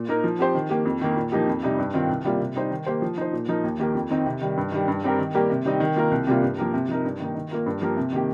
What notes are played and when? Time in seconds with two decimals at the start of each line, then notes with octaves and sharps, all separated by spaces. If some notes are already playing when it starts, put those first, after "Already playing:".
Already playing: A#2
0.09 A#3 D#4 A#4
0.24 F3
0.39 C4 G4 C5
0.55 D#3
0.70 A#3 G4
0.85 F2
1.01 D#3 A#3
1.16 A#2
1.32 F3 A#3 D#4 G4
1.47 F2
1.63 C3 G3 D#4
1.78 G2
1.94 D#3 C4 F4
2.09 C2
2.25 C3 G3 A#3 F4
2.40 C3
2.56 G3 D#4 C5
2.71 D#3
2.87 A#3 G4 C5
3.02 F3
3.18 D#4 C5
3.33 A#2
3.49 F3 D#4 A#4
3.64 D#2
3.79 D#3 A#3 G4 A#4
3.95 F2
4.10 D#3 C4 D#4
4.26 C3
4.41 D#3 G3
4.57 G2
4.72 D#3 G3
4.88 G2
5.04 G3 C4 G4 A#4
5.19 D#3
5.34 G3 A#3 G4 A#4
5.50 C3
5.65 D#3 G3 C4 D#4
5.80 D#3
5.96 A#3 F4 A#4
6.11 C2
6.27 C3 G3 A#3 F4
6.42 G2
6.58 F3 A#3 G4 A#4
6.74 C3
6.89 F3 D#4 A#4
7.05 G2
7.20 D#3 A#3 D#4
7.35 D#3
7.51 A#3 F4 A#4
7.66 G2
7.82 F3 A#3 G4 A#4
7.97 C3
8.13 D#3 A#3 G4